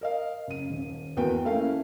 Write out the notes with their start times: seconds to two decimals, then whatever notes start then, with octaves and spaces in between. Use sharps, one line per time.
0.01 A#4 D#5 F5
0.47 F#1 D#7
0.70 D#1
1.17 E2 A#3 F#4 B4 G5
1.45 A3 A#3 C#4 E4 F5